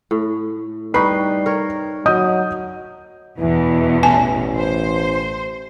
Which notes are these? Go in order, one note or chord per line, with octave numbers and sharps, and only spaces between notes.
A2
G3 D#4 B4 C#6 C7
A#4 C#5
F#3 D#5 D#6 G6
E2 B2 E3
A1 G#5 A5
C5